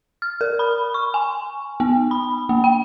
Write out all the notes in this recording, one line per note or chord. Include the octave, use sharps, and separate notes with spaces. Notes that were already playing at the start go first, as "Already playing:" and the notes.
F6
A#4
B5
C#6
G#5
B3
B5
A#3
G5